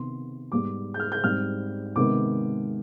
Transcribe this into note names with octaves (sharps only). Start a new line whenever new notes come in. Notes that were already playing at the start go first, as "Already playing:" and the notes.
Already playing: C3 D#3 B3 C6
G#2 G3 B3 D6
G6
F6
G6
G#2 G3 C4 F6
C3 D#3 G#3 B3 D6